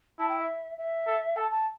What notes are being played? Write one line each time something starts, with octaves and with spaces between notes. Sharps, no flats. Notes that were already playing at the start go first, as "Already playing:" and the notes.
E4 A5
G5
E5
E5
A4
A4 A5
A5